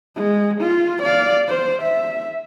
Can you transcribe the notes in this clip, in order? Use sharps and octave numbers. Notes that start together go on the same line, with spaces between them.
G#3
F4
D5 F5
C5
E5